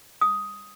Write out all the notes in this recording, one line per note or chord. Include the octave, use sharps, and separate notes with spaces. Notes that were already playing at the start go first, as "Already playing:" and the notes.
D#6